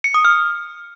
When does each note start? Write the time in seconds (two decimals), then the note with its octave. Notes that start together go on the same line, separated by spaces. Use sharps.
0.04 C#7
0.14 D#6
0.25 F6